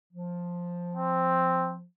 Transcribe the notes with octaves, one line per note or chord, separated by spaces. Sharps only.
F3
C4